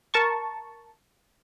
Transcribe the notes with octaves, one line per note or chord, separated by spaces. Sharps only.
A#4 A5 C#6